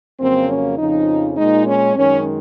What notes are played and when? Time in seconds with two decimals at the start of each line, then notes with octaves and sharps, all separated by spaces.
0.20 F2 C#3 F#3 A#3 C4
0.49 C#4
0.78 F2 C#3 F3 D#4
1.37 A#2 G#3 D#4
1.67 C#4
1.96 F#2 D#3 G#3 C#4